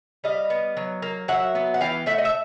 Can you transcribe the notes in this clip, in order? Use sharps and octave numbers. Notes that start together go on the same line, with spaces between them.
G3 D#5 F5
B3
F#3
A#3
F#3 E5 F#5
B3
F#5
E3 F5 G5
A3 E5 F#5
D#5
E5